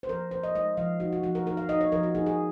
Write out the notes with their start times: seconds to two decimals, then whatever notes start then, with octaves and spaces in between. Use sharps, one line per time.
0.03 C5
0.09 F3 A#4
0.31 F3 C5
0.43 D#5
0.55 G#3 D#5
0.77 F3 F5
1.00 D#4 F#4
1.13 F#4
1.23 F3 F#4
1.35 A#4
1.46 D#4 A#4
1.57 F5
1.69 D#4 D#5
1.81 C#5
1.92 F3 A#4
2.03 F#4
2.15 D#4 G#4
2.26 G#4